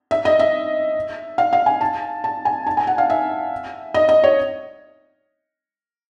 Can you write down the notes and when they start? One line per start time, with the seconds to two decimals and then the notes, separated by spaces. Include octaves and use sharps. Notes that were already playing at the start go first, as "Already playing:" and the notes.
0.11 E5
0.25 D#5
0.39 E5
1.38 F5
1.53 F5
1.66 G#5
1.81 A5
2.24 A5
2.45 G#5
2.67 A5
2.77 G#5
2.87 F#5
2.98 F5
3.10 E5
3.94 D#5
4.09 D#5
4.24 C#5